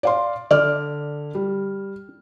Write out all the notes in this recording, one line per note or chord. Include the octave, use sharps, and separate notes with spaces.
D5 F5 C6
D3 D5 F6
G3